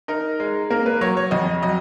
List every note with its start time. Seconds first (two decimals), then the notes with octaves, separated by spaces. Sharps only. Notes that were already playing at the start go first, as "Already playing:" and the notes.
0.08 D#4 A#4
0.40 G#3
0.70 A#3 A#4
0.86 B4
1.01 F#3 C#5
1.17 C#5
1.31 F2 D#5
1.62 F#3 D#5